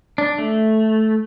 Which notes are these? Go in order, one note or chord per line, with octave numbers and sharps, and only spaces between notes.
D4
A3